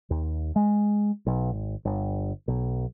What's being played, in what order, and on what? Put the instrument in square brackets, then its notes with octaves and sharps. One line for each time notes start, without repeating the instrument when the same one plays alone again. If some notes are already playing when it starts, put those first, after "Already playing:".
[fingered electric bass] D#2
G#3
B1
G#1
G1
B1